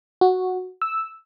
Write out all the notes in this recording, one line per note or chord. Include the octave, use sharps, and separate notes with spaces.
F#4
E6